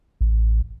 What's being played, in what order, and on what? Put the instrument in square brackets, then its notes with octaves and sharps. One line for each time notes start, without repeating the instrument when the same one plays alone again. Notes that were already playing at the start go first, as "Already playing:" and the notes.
[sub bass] A1